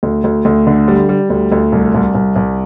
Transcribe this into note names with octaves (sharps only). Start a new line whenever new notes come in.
D2
D2
D2
D3
G3
G3
D2
D2
C2
C2
C2
C2